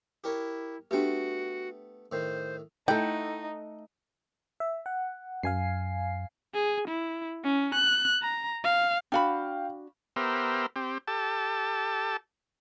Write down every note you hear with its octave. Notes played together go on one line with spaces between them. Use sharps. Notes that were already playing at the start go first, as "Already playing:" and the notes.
E4 G4 A#4 C#5
A3 B3 D4 F#4 G4 G5
A2 D#3 C5
A3 D#4 E4 A4 F#5 G5
E5
F#5
F#2 F5 G#5 C7
G#4
E4
C#4
F#6
A#5
F5
D4 F#4 F5 G5 B5
B3 G4 A#4 C5 E5
C4 G4
G4 A4 A5